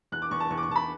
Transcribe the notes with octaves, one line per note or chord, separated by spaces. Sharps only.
E2 F#6
D6
E2 C#6
A5
E2 C#6
D6
C#6
E2 A5
B5